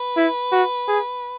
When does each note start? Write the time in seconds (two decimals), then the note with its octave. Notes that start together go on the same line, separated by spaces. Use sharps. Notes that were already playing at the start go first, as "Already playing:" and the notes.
Already playing: B4
0.17 E4
0.52 F#4
0.88 G#4